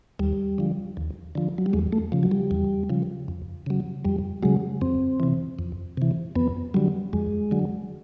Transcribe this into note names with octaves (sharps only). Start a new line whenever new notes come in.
D#2 G3
D3 F3
D#2
D3 F3
F#3
G3
E2 G#3
A3
C#3 F3
F#3
G3
E2
C#3 F3
F2
C#3 F#3
F2 G3
C#3 F#3 G#3
F2 C4
C3 E3
F2
C3 E3
F2 B3
D3 F#3 G3
F2 G#3
D3 F#3